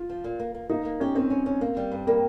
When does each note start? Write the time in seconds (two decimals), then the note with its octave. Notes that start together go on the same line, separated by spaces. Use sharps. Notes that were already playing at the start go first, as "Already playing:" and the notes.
Already playing: F4
0.09 F3
0.24 A#2
0.39 A#3
0.55 A#3
0.69 A#3 D#4
0.85 A#3
1.00 C#4 G4
1.15 D#3 C4
1.30 C#4
1.46 C#4
1.61 A#3
1.77 G3
1.92 G2
2.07 G3 A#3